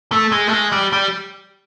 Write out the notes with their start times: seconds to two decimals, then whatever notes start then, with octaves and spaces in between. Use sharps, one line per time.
0.12 A3
0.32 G#3
0.47 A3
0.53 G#3
0.72 G3
0.93 G3